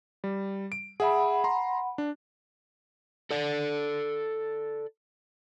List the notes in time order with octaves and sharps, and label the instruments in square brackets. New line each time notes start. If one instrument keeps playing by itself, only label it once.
[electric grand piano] G3
D7
[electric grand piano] G#4 E5 [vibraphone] F#5 B5
[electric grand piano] A#5 C6
D4
[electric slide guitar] A4 D5